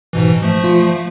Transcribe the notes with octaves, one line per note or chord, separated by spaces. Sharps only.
G#2 B2 E3
F3 A3
F4